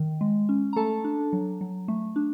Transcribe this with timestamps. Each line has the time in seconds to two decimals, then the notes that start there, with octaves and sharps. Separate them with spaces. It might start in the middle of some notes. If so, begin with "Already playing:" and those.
Already playing: D#3
0.21 G#3
0.49 C#4
0.73 A#5
0.76 A3 A4 A5
1.04 D4
1.33 F#3
1.61 F#3
1.88 A3
2.16 D4